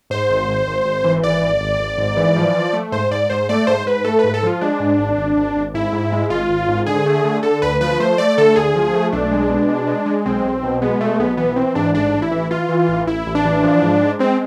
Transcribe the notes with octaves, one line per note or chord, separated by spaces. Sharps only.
G#2 C5
G#1
G#1
G#1
G#1
E3
G#1 D5
G#1
G#1
G#1
G#2
E3
F3
F3
A3
G#2 C5
G#2 D5
G#2 C5
A3 D5
G#2 C5
G#2 B4
A3 A4
B4
G#2
A4
F3 F4
G#3 D4
G#2
G#1
G#1
G#1
G#1
G#2 E4
G#2
G#3
G#1 F4
G#1
G#2
D3 G#4
A3
D3
D3 A4
D2 B4
F3 B4
A3 C5
A3 D5
D3 A4
D2 G#4
F3
A3
B1 D4
G#3
B2
G#3
G#3
G#3
B1 C4
B1
B2
G#3 B3
B2 A3
B1 B3
E3 B3
E3 C4
G#2 D4
A1 D4
A1
E4
E3
E3 F4
E3
A1
A1 E4
A1
D4
E3
F3
G#2
G#3
G#3 C4